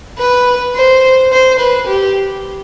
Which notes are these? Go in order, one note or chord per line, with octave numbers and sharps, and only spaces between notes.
B4
C5
C5
B4
G4